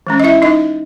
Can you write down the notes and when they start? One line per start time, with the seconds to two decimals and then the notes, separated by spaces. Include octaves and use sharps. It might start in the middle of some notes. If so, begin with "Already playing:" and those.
0.07 E3 G#3 C#4
0.20 D#5
0.24 E4 E5
0.42 D#4 D#5